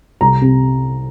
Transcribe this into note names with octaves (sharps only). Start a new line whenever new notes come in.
C2 A#5
C3